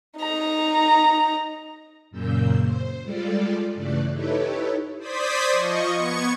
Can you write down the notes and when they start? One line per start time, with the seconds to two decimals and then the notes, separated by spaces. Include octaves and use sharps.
0.19 D#4 A#5
2.11 F#2 A#2 C#3 A#3 E6 G6
2.60 C5
3.03 G3 G#3 F4 A4 D5
3.74 G2 C#3 E3 A3 D5 F#6
4.11 D#4 E4 G4 A4 B4 C#5
4.99 C5 D5 D#6 G#6 B6
5.50 F3 D#5 C#6
5.94 B3 C#6 G#6 C#7